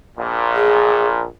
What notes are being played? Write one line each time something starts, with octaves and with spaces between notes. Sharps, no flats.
A#1 A#2
G#4